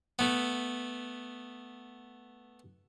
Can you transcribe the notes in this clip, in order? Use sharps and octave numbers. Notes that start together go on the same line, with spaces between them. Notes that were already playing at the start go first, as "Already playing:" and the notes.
A3 B3